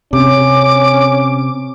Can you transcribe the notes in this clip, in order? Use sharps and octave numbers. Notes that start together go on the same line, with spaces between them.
C3 C#4 D6